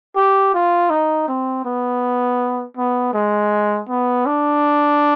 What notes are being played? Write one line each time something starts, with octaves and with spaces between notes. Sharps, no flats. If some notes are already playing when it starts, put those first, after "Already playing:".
G4
F4
D#4
C4
B3
B3
G#3
B3
D4